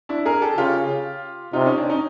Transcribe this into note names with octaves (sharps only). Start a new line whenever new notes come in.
D4 E4
G#4 A#4
G4 A4
C#3 F4 G4
C3 D#4 F4
C#4 D#4
C4 D4
C#4 D#4